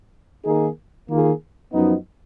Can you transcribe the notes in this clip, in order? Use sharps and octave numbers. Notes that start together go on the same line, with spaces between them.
D#3 A#3 D#4 G#4
D#3 A#3 F4 G#4
F#2 F3 B3 D#4